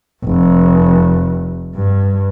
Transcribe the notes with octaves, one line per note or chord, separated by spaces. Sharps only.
F1
G2